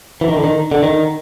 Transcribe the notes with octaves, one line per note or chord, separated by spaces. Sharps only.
E3
D#3
D3
D#3
D3
D#3